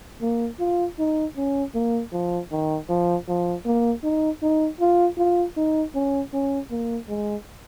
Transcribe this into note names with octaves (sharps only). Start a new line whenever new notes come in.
A#3
F4
D#4
C#4
A#3
F3
D#3
F3
F3
A#3
D#4
D#4
F4
F4
D#4
C#4
C#4
A#3
G#3